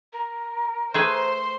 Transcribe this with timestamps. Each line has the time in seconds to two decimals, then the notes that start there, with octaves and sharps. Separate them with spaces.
0.13 A#4
0.94 A3 G#4 B4 C5 C6